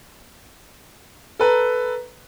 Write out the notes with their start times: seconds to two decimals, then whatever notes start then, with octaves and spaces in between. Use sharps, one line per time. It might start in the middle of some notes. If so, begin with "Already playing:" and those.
1.39 A4 B4 A#5